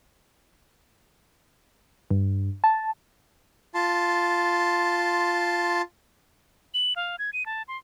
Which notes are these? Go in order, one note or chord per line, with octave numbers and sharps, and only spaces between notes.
G2
A5
F4 A5 C6
F#7
F5
G#6
D#7
A5
C6